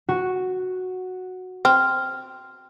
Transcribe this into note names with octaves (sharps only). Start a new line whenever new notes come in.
F#4
C4 F6